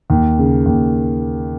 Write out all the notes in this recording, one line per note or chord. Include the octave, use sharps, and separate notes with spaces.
D#2
C#3
D#2